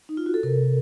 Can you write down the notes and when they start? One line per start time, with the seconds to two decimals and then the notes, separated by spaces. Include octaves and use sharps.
0.09 D#4
0.17 F4
0.26 F#4
0.34 A4
0.43 C3 A#4